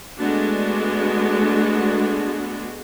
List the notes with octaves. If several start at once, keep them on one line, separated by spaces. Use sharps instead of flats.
G#3 A3 B3 D4 F#4